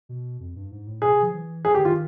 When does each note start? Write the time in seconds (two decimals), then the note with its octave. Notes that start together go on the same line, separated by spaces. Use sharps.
0.09 B2
0.40 F2
0.56 G2
0.71 G#2
0.87 A2
1.02 B2 G#4
1.13 C3
1.22 F3
1.34 E3
1.65 G#4
1.75 D3 G4
1.85 D#3 F4